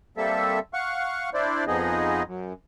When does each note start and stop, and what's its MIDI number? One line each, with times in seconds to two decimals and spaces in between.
0.17 0.59 55
0.17 0.59 58
0.17 0.59 60
0.17 0.59 69
0.17 0.59 76
0.74 1.29 77
0.74 1.29 78
0.74 1.29 85
1.34 1.65 62
1.34 1.65 64
1.34 1.65 72
1.34 1.65 74
1.67 2.23 41
1.67 2.23 53
1.67 2.23 59
1.67 2.23 63
1.67 2.23 68
1.67 2.23 75
2.27 2.53 42